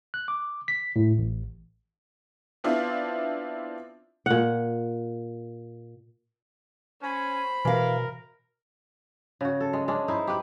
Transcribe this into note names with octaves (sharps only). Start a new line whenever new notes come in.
F#6
D6
B6
A2
A1
B3 C4 D4 E4 F4
A#2 F#5
C#4 C5 G#5 B5
B2 E3 A#4 F5
C#3 F#4
A4
G#3
G#3 C#4 D4
D#4 E4 G#4 C5
G4 B4